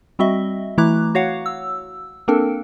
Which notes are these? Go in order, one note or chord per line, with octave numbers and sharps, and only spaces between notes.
G3 C4 F#4 D#5 E5
E3 A3 E4 A#5 D6 F#6
F#4 C#5 F5 F#5
E6
A#3 C4 D4 A4 A#4